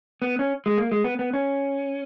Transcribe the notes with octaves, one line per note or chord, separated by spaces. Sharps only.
B3
C#4
G#3
A#3
G#3
B3
B3
C#4